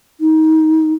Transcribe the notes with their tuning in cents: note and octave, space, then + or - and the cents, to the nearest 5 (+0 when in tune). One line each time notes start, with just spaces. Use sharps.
D#4 +25